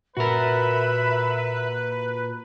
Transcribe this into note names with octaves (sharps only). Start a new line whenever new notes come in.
A#2 F#4 A#4 B4 E5 B5